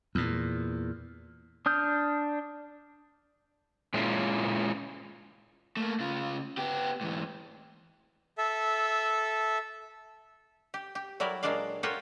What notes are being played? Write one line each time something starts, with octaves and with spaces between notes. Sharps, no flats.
E2 A#2
D4 D#6 F6 G6
A#2 G#3 C#4 E4 F4
A3 A#3
C#3 F4
B3 G4
G#2 E3
A4 E5
G4
G4
F#3 G3 E4 A#4 D5
A#2 F#3 G#3 D4 D5 F5
F4 G4 A4 A#4 C#5 F#5